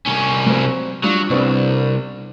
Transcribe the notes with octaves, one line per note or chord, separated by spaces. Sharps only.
C2 C#4
F#3 C4
F#3 G3 D4 F4
C2 B3 C4 D4